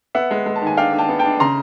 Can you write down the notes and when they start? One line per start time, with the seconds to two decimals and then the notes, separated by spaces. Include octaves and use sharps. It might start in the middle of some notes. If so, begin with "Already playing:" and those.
0.15 B3 E5 F#5
0.31 G#3
0.46 G#3
0.56 A5
0.62 D#3 G#5
0.77 D4 F5 G5
0.93 D4
0.98 G5 A5
1.09 B3
1.19 G5 A5
1.25 D4
1.40 C#3 A#5 C6